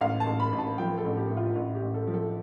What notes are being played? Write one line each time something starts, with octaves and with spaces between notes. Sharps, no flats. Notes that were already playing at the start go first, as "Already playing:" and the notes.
A1 F5
A5
A1
B5
A1
A5
F3 G5
A4
A1
G4
A2
F4
A1
G4
A1
A4
F3
A4